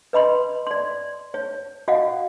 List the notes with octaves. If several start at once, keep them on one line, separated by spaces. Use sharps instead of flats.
B4 D#5 B5 C6
D5 C6
C#5
F#4 D#5 F5 F#5